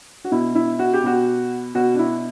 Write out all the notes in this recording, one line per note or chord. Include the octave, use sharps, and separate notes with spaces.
F#4
B2 E4
E4
F#4
G4
B2 F#4
B2 F#4
D4
E4